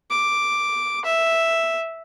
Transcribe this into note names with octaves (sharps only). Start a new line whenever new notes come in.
D6
E5